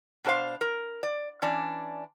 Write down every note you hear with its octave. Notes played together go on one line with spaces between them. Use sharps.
B2 D4 A4 C5 F5
A#4
D5
E3 C#4 D4 D5